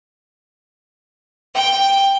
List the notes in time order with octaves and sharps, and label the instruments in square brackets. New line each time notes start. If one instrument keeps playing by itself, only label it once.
[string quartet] G5